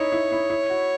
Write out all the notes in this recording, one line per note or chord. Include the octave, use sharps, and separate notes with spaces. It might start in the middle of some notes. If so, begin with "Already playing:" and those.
Already playing: D#4 E4 C#5
E4
E4
E4
F#4